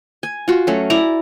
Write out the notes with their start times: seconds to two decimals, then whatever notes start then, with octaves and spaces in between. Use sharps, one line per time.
0.23 G#5
0.48 F4 F#4
0.67 F#3 A3 C#4
0.90 E4 D5 A#5